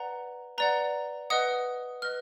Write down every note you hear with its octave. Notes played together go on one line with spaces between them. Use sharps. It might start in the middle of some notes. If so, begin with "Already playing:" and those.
Already playing: B4 D5 F#5 A#5
B4 D5 F#5 A#5
B4 D#5 F#5 D#6
B4 D#5 F6